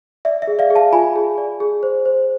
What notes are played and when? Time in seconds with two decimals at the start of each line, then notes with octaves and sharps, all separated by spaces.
0.25 D5 E5
0.42 E5
0.47 G#4
0.59 D5 F5
0.70 G#4
0.75 F5 A5
0.92 F4 G#5 B5
1.16 G#4
1.38 D5
1.60 G#4
1.83 C5
2.05 C5